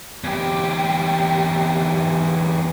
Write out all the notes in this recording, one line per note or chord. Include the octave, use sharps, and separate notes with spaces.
E2 G4